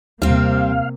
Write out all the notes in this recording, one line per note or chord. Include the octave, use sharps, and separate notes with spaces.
D#2 C3 G3 A#3 C4 F5